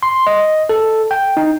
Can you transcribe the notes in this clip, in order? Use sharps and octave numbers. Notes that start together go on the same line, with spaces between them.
C6
D#5
A4
G5
D#4